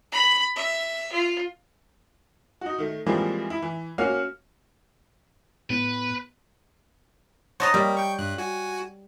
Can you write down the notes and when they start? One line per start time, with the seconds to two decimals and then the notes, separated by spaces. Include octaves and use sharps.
0.12 B5
0.56 E5
1.12 F4
2.61 D#4 F#4
2.78 D#3 A3
3.06 E3 F3 G3 G#3 A#3 C4
3.50 E4
3.62 E3
3.98 A#3 C#4 F#4 F6
5.70 A2 B3 B4
7.60 C5 C#5 D#5 F#5 A5 A#5
7.74 G3 A#3
7.97 G5 C#6
8.19 G2 F#6
8.38 F#4 G#5